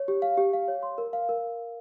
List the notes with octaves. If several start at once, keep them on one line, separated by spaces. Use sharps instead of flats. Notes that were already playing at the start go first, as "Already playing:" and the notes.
Already playing: C#5
G4
F5
G4
F5
C#5
C6
A#4
F5
A#4